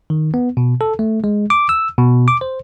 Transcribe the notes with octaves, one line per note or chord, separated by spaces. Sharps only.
D#3
B3
B2
A4
A3
G#3
D6
E6
B2
D6
C5